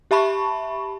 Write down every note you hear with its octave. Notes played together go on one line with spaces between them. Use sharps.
G4 E5 A5 B5 C#6